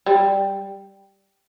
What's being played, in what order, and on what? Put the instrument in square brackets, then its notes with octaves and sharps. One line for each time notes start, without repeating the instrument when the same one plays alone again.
[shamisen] G3